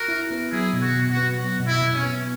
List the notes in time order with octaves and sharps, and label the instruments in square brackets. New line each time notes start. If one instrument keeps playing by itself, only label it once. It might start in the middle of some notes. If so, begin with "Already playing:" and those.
Already playing: [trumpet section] F#4 A#4
[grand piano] E4
B3
[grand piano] F#3 [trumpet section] E4 G#4
[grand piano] B2
[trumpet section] F#4
[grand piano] B2
[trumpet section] F#4
[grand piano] B3
[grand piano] F#3 [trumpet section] F#4
[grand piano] B2
[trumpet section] E4
[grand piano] B2
[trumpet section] C#4
[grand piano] B3